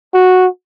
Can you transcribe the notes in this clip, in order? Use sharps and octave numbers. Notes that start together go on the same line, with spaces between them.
F#4